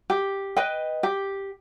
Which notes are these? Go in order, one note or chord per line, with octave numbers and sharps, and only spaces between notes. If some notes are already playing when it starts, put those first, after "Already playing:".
G4
B4 D#5 G5
G4